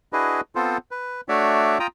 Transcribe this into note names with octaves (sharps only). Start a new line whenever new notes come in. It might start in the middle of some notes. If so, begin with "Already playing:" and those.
D4 E4 F#4 G#4 B4 D#5
B3 C4 F4 A4 C5
B4
A3 D4 F#4 C#5 D5 E5
F4 G5 A#5 D#6